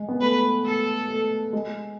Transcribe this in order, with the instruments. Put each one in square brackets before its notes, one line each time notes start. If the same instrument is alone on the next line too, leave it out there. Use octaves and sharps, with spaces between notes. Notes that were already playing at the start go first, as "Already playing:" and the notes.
Already playing: [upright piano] G#3
B3
[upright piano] A3 [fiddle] B4
[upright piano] A3 [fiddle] A4
[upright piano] A3
G#3